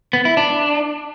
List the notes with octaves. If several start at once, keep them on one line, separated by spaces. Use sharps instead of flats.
B3
E4
D4